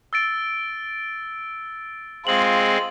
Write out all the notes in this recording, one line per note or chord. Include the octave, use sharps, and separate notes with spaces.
E6 A6 D7
G#3 C4 F4 F#7